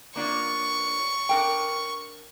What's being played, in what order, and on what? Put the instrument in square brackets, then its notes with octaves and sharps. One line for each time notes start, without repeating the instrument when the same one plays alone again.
[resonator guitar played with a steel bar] A#3 D4 F4 [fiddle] C#6
[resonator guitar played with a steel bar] D4 A#4 G5